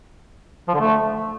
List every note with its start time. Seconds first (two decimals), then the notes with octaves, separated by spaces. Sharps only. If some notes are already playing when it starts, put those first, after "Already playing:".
0.68 F3
0.74 D3
0.80 A3